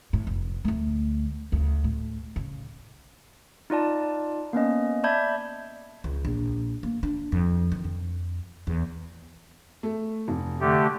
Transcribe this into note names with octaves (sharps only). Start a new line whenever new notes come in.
A2
F1
D2 A3
D2 C#3
A2
C#3
D#4 F4 D5 A5
A#3 B3 C#4 D#5
D5 E5 A5 B5 G6 G#6
C#2
A#1
A#3
D4
F2
D#3
F2
E2
A3
F1
D3 A3 G4